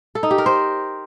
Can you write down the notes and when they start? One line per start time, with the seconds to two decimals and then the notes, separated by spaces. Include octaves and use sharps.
0.15 A4
0.23 D#4
0.31 G4
0.38 A#4
0.46 C5